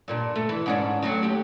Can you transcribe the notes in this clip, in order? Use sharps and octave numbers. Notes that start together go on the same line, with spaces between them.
G2 A#2 D4
A3
E3
G#2 C#4 D4
F#3 A3 C4
D#2 G4